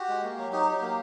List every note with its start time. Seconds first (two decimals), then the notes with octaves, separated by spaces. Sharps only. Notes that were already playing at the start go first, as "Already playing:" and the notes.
Already playing: F#4 G4
0.09 G#3
0.23 A#3
0.38 F#3
0.53 D#4 G4
0.68 F#3
0.82 A#3